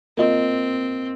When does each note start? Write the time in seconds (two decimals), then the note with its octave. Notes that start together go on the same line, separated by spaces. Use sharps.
0.17 A#3 C4 F4 D#5